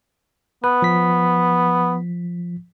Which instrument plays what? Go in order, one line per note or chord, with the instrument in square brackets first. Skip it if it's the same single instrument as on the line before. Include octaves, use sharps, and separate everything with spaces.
[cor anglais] B3 [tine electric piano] B4
[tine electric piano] F3 B6